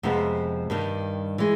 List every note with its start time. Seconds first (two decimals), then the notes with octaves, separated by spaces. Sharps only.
0.03 F2 C3 F3 G#3 B3
0.70 G2 D#3 G3
1.38 E3 G#3